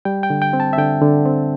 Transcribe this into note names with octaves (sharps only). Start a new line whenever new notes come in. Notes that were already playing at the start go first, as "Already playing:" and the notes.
G3 G5
G5
D3
G5
C4
A5
E5
D3 G5
D3
C4